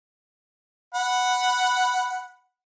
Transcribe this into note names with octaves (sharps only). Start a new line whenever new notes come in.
F#5 B5